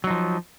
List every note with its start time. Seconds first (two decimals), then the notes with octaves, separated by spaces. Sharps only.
0.04 F#3
0.07 D#4
0.10 F3